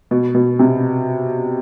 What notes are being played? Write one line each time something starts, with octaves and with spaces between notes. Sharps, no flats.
B2
B2
C3